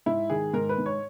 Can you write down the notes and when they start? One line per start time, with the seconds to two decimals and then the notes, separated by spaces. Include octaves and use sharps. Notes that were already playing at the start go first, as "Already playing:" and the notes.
0.06 G#2 E4
0.30 D#3 G#4
0.53 G#2 A#4
0.69 B4
0.78 G#2
0.86 C#5